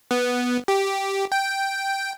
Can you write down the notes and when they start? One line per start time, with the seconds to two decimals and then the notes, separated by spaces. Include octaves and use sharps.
0.11 B3
0.68 G4
1.32 G5